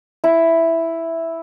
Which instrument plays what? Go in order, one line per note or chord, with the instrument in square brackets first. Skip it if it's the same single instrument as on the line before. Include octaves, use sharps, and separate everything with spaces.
[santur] E4